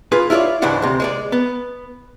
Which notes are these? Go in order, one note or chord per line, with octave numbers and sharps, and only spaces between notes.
F4 G#4 B4
E4 F4 G#4 C#5 D5
C#2 G#2 E3 G#3 D4 F#5
D2 C3
G#3 C#5 D5
B3